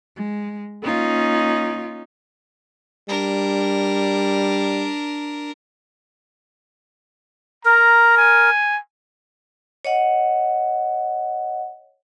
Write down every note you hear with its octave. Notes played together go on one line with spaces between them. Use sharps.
G#3
A#3 C#4 D#4 F4
G3 D4 A#4
A#4 A#5
G#5
C#5 D#5 F#5